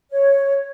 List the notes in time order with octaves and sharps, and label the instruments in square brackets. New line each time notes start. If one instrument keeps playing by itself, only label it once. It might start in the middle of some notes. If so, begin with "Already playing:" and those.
[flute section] C#5